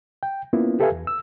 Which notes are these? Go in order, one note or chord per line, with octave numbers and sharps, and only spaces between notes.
G5
A#3 B3 C#4 E4 F4
G4 A4 B4 E5 F5 G#5
E2
E6